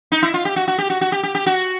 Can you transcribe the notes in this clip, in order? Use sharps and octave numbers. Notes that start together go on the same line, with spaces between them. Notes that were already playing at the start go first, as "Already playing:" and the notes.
D#4
E4
F4
G4
F#4
F#4
G4
F#4
F#4
G4
G4
G4
F#4